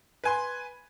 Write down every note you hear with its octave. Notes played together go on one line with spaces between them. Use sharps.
B4 G#5 C6